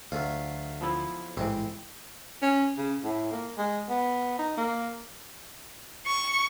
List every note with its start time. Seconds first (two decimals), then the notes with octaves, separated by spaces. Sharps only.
0.12 D2 F#3 A3 F4
0.81 F3 B3 E4
1.37 A1 G#2 E3 C4
2.42 C#4
2.78 C#3
3.04 A2
3.32 A#3
3.58 G#3
3.89 B3
4.39 D#4
4.57 A#3
6.07 C#6